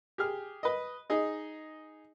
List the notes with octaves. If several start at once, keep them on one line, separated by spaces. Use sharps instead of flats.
G4 G#4 F6
B4 D#5
D#4 G#4 D#5